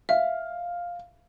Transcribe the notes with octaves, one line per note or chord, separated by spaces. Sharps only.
E5 F5